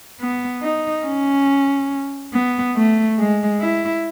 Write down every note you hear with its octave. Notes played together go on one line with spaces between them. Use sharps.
B3
D#4
C#4
B3
A3
G#3
E4